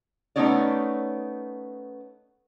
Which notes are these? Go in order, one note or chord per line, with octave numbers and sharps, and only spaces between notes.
A3 B3 C#4 D#4 C#5 D5